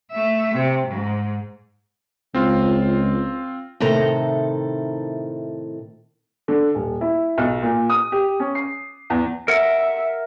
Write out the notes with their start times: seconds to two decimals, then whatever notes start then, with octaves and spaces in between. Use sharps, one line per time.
0.12 A3 E5
0.55 C3
0.87 G#2
2.34 C#2 C4 F4
3.80 A2 C3 D#3 A4 A#5
6.48 D3
6.75 D#1
7.01 E4
7.38 B1
7.62 A#2
7.90 D#6
8.12 G4
8.40 C#4
8.55 C7
9.10 E2
9.48 A#4 E5 F#5